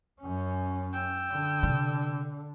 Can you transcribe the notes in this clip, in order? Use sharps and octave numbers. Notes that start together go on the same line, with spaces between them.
F#2 C#4
G5 E6
D3
C3 D4